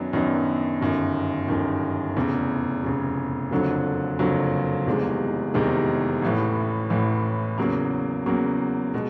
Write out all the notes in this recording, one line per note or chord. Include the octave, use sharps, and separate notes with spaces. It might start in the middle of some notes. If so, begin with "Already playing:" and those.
Already playing: F#2 D#3 F#3 B3 D4
F#2 D#3 F#3 B3 D4
G1 F#2 D#3
G1 F#2 D#3
F1 E2 C#3
F1 E2 C#3
F#1 F2 D3 F#3
F#1 F2 D3 F#3
F1 E2 C3 D#3 G#3
F1 E2 C3 D#3 G#3
A1 A2 E3
A1 A2 E3
E2 C#3 F#3 A#3
E2 C#3 F#3 A#3
B2 G#3